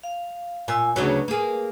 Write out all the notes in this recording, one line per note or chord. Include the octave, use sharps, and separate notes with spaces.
F5
A#2 G#5 E6
D2 C#3 F#3 B4
A#3 G#4